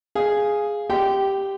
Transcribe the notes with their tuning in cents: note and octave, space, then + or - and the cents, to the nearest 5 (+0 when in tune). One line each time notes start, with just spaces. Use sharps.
G#4 +0 F5 +0
G4 +0 G5 -15 C6 -30